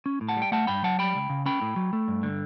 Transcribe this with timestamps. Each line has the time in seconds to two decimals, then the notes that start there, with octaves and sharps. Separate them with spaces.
0.06 C#4
0.21 A2
0.29 F#5 A5
0.37 G3
0.42 G5
0.52 A3 F#5 A5
0.67 G2 G5 B5
0.84 F#3 F#5 A5
0.99 G3 G5 B5
1.15 C#2
1.30 C#3
1.46 C#4 G5 B5
1.61 A2
1.76 F#3
1.93 A3
2.08 G2
2.23 D3